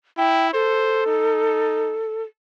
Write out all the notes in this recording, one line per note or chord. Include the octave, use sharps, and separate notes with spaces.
E4 G5
A4 C5
D#4